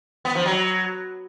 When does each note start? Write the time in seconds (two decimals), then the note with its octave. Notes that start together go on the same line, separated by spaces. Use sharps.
0.25 B3
0.35 F3
0.46 F#3